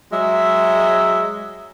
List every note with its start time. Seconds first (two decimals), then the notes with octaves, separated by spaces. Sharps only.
0.12 F#3 G#3 E5